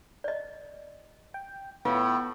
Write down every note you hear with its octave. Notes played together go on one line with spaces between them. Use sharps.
D5 D#5
G5
A2 B3 F4 F5